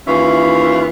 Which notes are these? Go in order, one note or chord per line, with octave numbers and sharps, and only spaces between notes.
D#2 E3 C#4 E4 F4